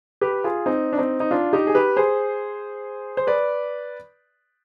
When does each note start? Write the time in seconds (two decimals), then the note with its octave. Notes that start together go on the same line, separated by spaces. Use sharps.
0.21 G4 B4
0.44 F4 G#4
0.66 C4 D#4
0.93 D4
0.98 C4 D#4
1.20 D#4
1.31 D4 F4
1.53 D#4 G4
1.67 G#4
1.75 G4 B4
1.96 G#4 C5
3.17 C5
3.27 B4 D5